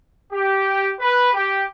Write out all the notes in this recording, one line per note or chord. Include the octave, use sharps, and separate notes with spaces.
G4
B4
G4